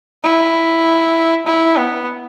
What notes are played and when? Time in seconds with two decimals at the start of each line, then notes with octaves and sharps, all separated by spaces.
0.23 E4
1.47 E4
1.78 B3